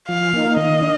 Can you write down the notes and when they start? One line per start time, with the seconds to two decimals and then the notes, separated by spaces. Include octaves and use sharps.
0.09 F3 F5
0.33 A#3 D#4
0.57 D#3 D#5
0.82 D4